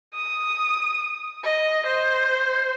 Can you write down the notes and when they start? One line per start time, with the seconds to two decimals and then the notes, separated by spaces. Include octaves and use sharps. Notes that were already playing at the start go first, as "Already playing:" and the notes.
0.14 D#6
1.43 D#5
1.86 C5